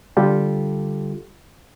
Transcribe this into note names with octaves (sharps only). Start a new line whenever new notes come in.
D3 G3 F4 G4 A4